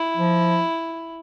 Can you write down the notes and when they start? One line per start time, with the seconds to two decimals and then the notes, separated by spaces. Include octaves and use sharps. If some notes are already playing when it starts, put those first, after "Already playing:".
Already playing: E4
0.17 F3